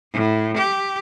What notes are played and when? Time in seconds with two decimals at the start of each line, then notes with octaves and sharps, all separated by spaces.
0.14 A2
0.57 G4